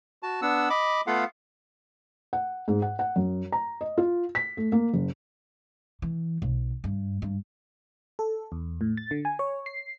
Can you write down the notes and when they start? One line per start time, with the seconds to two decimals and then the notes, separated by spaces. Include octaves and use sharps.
0.23 F#4 A5
0.42 B3 D4 F#5 E6
0.70 D#5 B5 D6
1.07 A3 B3 F4 A4 F5 F#5
2.33 F#5
2.68 G#2
2.82 F#5
2.99 F#5
3.16 F#2
3.52 A#5
3.81 D#5
3.97 F4
4.35 B6
4.57 A3
4.72 A#3
4.93 F#1
6.02 E3
6.42 B1
6.84 G2
7.22 G2
8.19 A4
8.52 E2
8.81 A2
8.97 A6
9.11 D3
9.25 G#5
9.39 C#5
9.66 C7